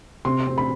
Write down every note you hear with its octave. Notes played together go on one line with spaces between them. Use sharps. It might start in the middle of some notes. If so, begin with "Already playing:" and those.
C3 C6
C4
B5